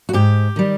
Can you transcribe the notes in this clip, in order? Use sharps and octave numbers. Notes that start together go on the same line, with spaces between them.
F#4
G#2 G4
D#3 G3